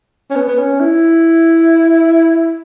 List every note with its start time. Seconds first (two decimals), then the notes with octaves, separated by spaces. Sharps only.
0.31 C#4
0.36 B3
0.48 B3
0.58 C#4
0.81 E4